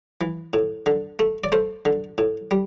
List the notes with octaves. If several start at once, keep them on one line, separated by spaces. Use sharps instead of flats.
E3
A2
D3
A3
D5
A3 C5
D3
A2
G3